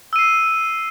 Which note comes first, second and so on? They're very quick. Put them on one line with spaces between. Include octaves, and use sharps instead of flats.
E6 D#7 C7